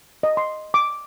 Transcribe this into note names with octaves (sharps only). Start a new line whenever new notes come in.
D#5
C6
D6